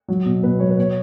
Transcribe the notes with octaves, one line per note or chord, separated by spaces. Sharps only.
F#3
B2
B2 B4
F#3 C#5
B4
B2 C#5